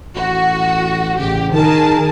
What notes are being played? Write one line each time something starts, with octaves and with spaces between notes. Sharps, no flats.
A1 F#4
A1 C#3 G4
D#3 G#4 A#4 A5